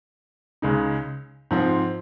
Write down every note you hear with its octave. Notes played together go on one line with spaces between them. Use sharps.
C#2 C#3 G#3 D#4
G#2 F3 C4